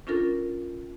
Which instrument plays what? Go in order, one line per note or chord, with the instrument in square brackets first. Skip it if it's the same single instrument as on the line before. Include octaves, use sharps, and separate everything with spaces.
[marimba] C#4 D4 F4 A4 A#4